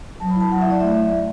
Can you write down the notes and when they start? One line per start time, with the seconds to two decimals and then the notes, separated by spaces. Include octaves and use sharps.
0.20 F#3 A5
0.30 B5
0.35 E4 A5
0.51 F#3 F#5
0.61 E5
0.66 E4 D5
0.81 A3 E5